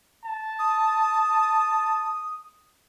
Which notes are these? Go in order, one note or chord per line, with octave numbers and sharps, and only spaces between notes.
A5
D#6